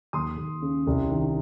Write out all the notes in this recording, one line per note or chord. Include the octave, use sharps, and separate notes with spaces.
D#2 C6 D#6
D#2
C#3
C2
D#3